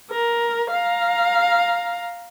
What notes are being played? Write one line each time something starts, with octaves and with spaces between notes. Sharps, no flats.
A#4
F5 A#5